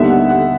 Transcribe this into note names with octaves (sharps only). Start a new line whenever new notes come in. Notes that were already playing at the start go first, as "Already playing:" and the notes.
Already playing: D#2 D3 G3 B3 D#4 E5
F#5
F#5